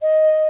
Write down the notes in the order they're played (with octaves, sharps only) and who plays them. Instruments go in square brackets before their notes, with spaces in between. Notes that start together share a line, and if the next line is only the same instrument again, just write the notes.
[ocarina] D#5